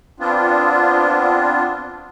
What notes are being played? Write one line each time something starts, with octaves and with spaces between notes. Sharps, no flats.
B3 C4 D4 F4